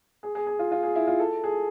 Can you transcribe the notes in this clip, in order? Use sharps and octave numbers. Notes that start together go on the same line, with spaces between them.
G#4
G#4
G#4
F4
F4
G#4
E4
F4
A4
G#4